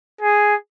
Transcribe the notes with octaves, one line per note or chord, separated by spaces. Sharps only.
G#4